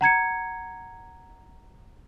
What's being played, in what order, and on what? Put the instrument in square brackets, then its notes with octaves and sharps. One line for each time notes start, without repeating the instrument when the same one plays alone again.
[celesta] F#5 A#5 G#6 C#7